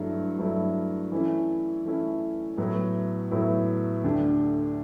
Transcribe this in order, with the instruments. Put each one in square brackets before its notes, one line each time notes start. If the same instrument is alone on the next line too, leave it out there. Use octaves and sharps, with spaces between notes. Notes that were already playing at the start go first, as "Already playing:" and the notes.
Already playing: [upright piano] G2 F#3 A3 E4
G2 F#3 A3 E4
E3 A3 C#4 E4
E3 A3 C#4 E4
A2 F#3 B3 E4
A2 F#3 B3 E4
D2 D3 A3 D4 G4